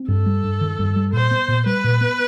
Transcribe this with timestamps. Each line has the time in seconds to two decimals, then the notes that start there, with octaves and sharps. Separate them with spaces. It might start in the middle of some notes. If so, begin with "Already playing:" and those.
Already playing: C4
0.08 G2 A4
0.26 G3
0.44 G2
0.61 D#3
0.79 G2
0.96 G3
1.13 A#2 C5
1.31 B3
1.48 A#2
1.66 G3 B4
1.84 A#2
2.01 B3